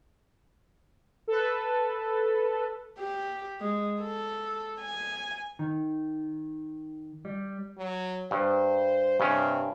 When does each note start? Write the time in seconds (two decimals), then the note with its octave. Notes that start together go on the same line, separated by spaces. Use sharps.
1.27 A4 B4
2.99 G4
3.61 G#3
4.01 A4
4.80 G#5
5.59 D#3
7.25 G3
7.78 F#3
8.31 G2 C5
9.20 G2 C3 C#4